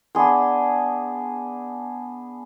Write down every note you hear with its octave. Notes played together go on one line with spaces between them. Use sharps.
B3 D4 G#4 C6